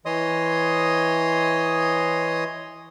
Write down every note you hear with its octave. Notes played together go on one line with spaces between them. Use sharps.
E3 C#5 D#5 C6 D#6